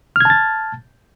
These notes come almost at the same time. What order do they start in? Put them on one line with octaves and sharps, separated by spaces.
F6 G#6 A5 A6